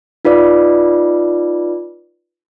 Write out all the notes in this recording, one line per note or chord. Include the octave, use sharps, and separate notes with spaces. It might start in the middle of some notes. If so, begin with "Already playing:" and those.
D#4 F4 B4 D5